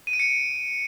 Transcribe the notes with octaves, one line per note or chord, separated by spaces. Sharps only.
D#7
D7
C#7